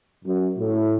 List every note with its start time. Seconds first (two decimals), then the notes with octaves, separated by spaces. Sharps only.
0.25 F#2
0.57 A2